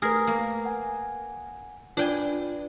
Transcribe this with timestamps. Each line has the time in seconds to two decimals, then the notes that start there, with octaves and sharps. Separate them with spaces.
0.02 A3 G#4 A#4 B4
0.27 A#3
0.65 F#5 G#5
1.97 D4 F4 B4 G5 G#5